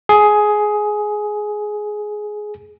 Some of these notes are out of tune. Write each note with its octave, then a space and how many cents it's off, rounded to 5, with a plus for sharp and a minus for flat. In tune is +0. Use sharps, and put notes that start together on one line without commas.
G#4 +15